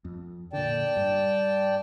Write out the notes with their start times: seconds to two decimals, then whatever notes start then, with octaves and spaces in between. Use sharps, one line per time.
0.05 F2
0.53 A#2 D3 D5 G5 A5
0.97 G2